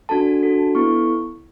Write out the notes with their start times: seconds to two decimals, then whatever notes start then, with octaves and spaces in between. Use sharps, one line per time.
0.09 D4 F#4 A4 A5
0.43 D4 F#4 A4
0.75 B3 E4 A4 C#6